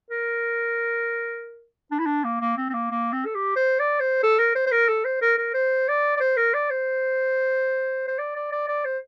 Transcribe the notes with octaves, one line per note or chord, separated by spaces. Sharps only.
A#4
D4
E4
D4
A#3
A#3
C4
C4
A#3
A#3
C4
A4
G4
C5
D5
C5
A4
A#4
C5
C5
A#4
A4
C5
A#4
A#4
C5
D5
D5
C5
A#4
D5
C5
C5
D5
D5
D5
D5
C5